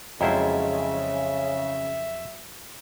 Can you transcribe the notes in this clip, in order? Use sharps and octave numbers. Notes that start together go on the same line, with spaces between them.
F2 C#3 F#3 G#3 E4 F4 C5 E5